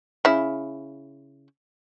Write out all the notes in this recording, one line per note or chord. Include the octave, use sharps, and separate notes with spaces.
C#3 E4